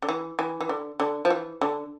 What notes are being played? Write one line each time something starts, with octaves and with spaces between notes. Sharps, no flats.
D3
E3
E3
E3
D3
D3
F3
E3
D3